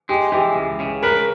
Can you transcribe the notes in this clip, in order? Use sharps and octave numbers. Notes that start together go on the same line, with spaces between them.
G#3 G4
E3 G4
C#2
C#3
A#4 B4